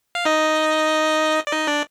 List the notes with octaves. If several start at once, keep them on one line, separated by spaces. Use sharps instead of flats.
F5
D#4 D#5
D5
D#4 D#5
D4 D5